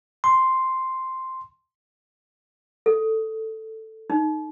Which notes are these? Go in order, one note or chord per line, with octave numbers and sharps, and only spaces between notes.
C6
A4
D#4